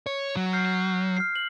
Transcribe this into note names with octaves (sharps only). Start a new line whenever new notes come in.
C#5
F#3
F6 G6 C7
F6 C7
F#7